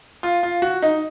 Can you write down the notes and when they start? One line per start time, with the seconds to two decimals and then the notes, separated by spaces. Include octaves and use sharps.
0.23 F4
0.43 F4
0.62 F#4
0.82 D#4